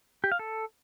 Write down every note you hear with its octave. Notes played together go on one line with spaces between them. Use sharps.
G4
F5
A4